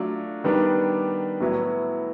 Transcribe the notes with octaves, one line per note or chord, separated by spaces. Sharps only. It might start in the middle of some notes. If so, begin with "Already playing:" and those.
Already playing: F#3 A3 D4 F4
D#3 G3 B3 D4
A2 F#3 B3 E4